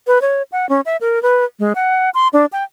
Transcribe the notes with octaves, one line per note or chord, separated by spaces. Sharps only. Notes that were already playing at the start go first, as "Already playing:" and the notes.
B4
C#5
F#5
C#4
E5
A#4
B4
G#3
F#5
C6
D4
G5